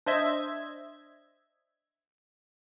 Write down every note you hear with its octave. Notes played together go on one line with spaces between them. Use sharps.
D4 C5 D#5 E5 G#6